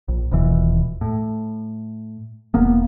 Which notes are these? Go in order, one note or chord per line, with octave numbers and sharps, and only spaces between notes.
A#1
D#1 B2 E3
A2
E1 A#3 B3